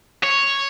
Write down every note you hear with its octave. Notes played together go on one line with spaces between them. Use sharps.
C#5